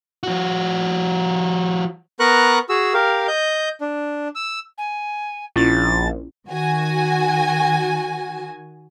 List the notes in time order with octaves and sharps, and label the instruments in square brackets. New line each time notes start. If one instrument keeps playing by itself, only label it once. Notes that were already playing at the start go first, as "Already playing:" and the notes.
[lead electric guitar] F3 F#4
[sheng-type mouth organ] B3 A#4 B4 A#5 C#6 F#6
F#4 G#4 E6
G4 A#4 F5
D#5 G6
D4
E6
[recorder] G#5
[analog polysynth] A#1 [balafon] C#4 E4 F4 [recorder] A6
[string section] D#3 F#4 G#5